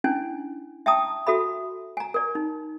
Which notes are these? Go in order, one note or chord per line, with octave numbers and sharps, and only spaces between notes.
C#4 D4 E4 G#5
E5 G5 A5 A#5 D#6
F#4 A4 E5 B5
G#5 A#5
A#4 D5
D#4